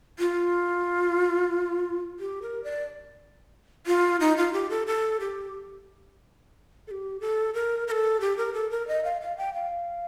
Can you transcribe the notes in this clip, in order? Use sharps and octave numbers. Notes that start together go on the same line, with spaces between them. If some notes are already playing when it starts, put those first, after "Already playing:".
F4
G4
A#4
D5
F4
D#4
F4
G4
A4
A4
G4
A4
G4
A4
A#4
A#4
A4
G4
A#4
A4
A#4
D#5
F5
F5
G5
F5